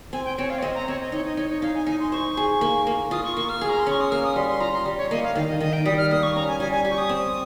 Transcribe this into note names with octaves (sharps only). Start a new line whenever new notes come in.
C4 G#5
G5
C4 C#5
F5
C#5
C4 D#5
A#5
C4 C#5
D#5
D#4 C#5
D#5
D#4 C#5
C#5
D#4 F5
G#5
D#4 G#5
C6
C5 C#6
G#4
A#3
A#3
F4 D#6
C#6
A#3 C#6
F6
G#4
A#5
C6
C#4 C#6
D#6
A#3 F6
D#6
G3 C6
C6
F4 A#5
C6
G3
C#5
A#3 D#5
F5
D#3 F5
D#5
D#3 D#5
G5
G3 D#6
F6
A#3 D#6
C#6
C#4 A#5
G#5
G3 G#5
G#5
G4
C#6
D#6
C4